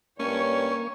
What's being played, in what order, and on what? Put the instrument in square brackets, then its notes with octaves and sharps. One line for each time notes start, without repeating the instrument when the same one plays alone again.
[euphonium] G2 [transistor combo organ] A#3 C#6 [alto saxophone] C#4 [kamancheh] C#5